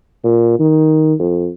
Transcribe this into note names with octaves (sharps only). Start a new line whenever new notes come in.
A#2
D#3
F2